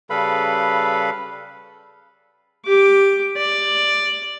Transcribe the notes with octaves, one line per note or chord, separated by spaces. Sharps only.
C#3 G3 A4 B4 F5 B5
G4 D6
D5